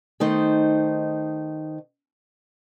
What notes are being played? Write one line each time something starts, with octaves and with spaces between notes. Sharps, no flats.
D#3 A3 D#4 C5